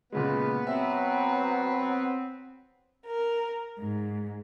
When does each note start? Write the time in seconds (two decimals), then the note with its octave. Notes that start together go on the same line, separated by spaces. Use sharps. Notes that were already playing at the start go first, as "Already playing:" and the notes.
0.12 A#2 C#3 G#3 B3 B4
0.67 F#3 C4 E5
3.07 A#4
3.79 G#2